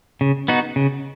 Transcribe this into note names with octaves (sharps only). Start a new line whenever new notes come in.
C#3
B3 D#4 F#4
C#3